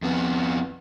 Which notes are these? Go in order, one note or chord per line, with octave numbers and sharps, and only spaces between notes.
F2 B3